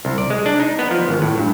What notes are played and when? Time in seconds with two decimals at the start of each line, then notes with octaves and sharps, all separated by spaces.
0.05 C2
0.18 D5
0.30 G#3
0.46 D4
0.60 D#4
0.79 B3
0.91 F3
1.09 G#1
1.22 A2
1.38 G2